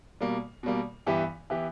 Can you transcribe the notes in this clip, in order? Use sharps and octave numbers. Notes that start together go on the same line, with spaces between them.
B2 G3 A#3
B2 G3 A#3
G2 E3 B3 E4 G4
E3 B3 E4 G4